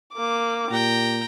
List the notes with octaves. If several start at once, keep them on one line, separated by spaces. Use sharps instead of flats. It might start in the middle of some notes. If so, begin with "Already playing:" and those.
A#3 D6
A#2 G4 G5 A#5